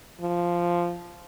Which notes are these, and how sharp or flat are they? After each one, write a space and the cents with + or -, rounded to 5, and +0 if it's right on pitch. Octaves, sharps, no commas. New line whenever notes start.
F3 -5